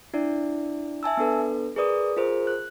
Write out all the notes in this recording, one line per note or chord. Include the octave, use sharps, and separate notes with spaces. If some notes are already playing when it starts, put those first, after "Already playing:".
D4 E4 D5
E5 G#5 A5 E6
B3 D4 A4 B4
G#4 A#4 B4 D5 D#6
F4 G#4 A#4 C5
F#6